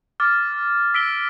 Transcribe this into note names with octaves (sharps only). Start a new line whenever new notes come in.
D6 F6 A6
E6 B6 D7 G7